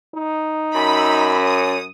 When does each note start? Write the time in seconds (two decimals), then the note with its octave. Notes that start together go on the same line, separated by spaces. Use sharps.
0.15 D#4
0.75 F#2 B5 E6
1.40 C#4 D#6